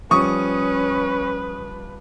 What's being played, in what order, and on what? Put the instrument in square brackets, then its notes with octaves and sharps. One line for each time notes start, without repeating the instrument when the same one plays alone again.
[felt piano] F3 G3 [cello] C#4 [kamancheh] B4 [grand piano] C#6 D#6